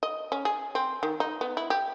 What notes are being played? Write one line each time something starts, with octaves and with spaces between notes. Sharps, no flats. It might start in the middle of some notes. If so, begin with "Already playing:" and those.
D#5
C#4
G#4
C4
D#3
D#4
B3
E4
G4